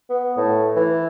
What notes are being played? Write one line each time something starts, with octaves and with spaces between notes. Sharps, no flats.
B3
A2
E3